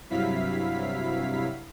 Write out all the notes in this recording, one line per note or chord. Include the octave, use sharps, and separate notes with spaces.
G2 C3 F#3 E4 F5 B6